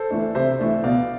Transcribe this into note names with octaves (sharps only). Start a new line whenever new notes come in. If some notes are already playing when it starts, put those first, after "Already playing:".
Already playing: A4 C5
E3 A3 D4
C3 C5 E5
E3 A3 D4
B2 D5 F5